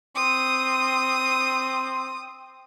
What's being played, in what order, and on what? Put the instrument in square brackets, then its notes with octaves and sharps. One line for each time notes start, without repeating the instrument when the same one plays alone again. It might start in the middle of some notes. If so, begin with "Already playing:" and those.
[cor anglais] C4 [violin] D#6